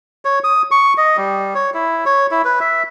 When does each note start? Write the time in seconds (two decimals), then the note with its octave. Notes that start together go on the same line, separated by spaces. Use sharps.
0.25 C#5
0.44 D#6
0.71 C#6
0.98 D#5
1.17 G3
1.55 C#5
1.74 E4
2.06 C#5
2.31 E4
2.45 B4
2.60 E5